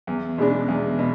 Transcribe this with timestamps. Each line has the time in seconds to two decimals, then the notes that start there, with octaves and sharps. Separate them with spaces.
0.07 E2
0.38 B2 G#3 D4
0.68 E2
0.99 B2